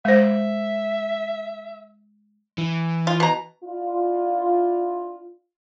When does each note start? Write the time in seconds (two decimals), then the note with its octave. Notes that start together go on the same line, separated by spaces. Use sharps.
0.05 G#3 C5 E5
2.58 E3
3.07 F4
3.20 B2 A#5
3.63 D4 E4 F4